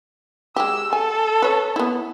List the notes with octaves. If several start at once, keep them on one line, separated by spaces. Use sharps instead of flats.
G#3 G4 E6
A4 G#5
B4 C#5
B3 E4